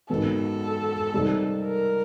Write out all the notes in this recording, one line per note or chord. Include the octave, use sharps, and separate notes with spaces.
G#2 D#3 F#3 B3 A4
C3 D#3 G3 C4 D#4
A#4